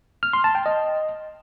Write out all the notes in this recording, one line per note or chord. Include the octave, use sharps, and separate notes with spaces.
F6
C6
A5
G5
D#5